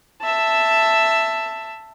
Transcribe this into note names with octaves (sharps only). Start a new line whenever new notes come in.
E5 A5